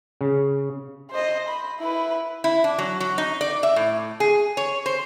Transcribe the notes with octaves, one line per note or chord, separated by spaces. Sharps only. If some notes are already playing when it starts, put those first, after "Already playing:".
C#3
C5 D#5
B5
E4 B4
E4
D4
F#3
F#3
D#4
D5
E5
A2
G#4
C#5
C5